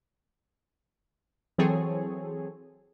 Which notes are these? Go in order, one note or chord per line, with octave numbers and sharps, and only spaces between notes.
E3 F#3 C4 G#4 A4 C#5